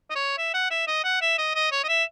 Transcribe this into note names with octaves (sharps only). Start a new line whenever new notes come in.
D#5
C#5
E5
F#5
E5
D#5
F#5
E5
D#5
D#5
C#5
D#5
E5